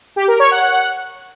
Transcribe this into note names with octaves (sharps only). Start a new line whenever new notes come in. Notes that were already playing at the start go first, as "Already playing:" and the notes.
G4
A#4
C#5
F#5